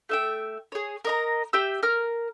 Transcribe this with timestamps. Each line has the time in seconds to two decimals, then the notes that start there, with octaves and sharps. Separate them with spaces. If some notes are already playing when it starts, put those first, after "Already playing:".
0.09 A3 E5 G5
0.72 G#4 C#5
1.05 A#4 D#5 A#5
1.53 G4 E5 G5 E6
1.83 A#4 F6